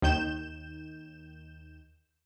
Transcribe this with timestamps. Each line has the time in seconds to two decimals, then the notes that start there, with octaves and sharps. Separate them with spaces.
0.02 D#2 D#3 G6 E7